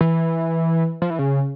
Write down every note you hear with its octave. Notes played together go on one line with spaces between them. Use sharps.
E3
F3
E3
C#3